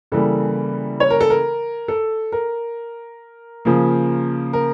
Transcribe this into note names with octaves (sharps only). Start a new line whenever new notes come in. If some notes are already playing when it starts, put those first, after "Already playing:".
C#3 E3 G3 A#3 A4
C#5
A#4
A4
A#4
A4
A#4
C#3 F3 A#3
A#4